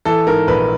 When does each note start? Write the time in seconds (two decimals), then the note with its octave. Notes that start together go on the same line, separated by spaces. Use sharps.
0.05 E3 A4
0.27 G#2 A#4
0.48 A#1 B4